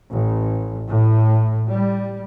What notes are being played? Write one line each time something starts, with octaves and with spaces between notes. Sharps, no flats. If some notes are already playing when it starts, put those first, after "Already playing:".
A1
A2
G3